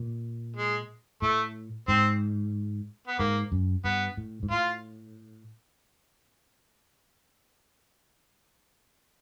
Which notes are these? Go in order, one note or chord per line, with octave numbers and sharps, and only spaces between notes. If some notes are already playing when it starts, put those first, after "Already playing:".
Already playing: A#2
G#3
A2 A3
G#2 C4
B3
G#2 A#3
F#2
G2 B3
A2
G#2
A2 F4